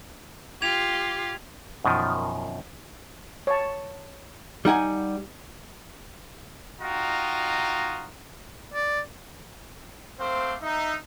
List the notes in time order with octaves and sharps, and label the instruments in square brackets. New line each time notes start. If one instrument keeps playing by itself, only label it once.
[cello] F4 G4 [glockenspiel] G#6 F7
[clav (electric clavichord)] F#2 B2 D#3 F3
[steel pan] C#5 A5
[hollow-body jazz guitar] G3 D#4 F#5 G#5
[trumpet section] D#4 F4 F#4 D#5 G5 A#5
[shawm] D5
[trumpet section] A3 C4 C5 F5 C6 D6
D#4 E5